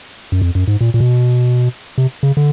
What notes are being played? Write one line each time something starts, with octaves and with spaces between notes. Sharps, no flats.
F#2
F2
F#2
G#2
A#2
A#2
B2
C3
C#3
D3